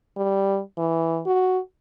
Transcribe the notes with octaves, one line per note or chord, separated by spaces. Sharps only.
G3
E3
F#4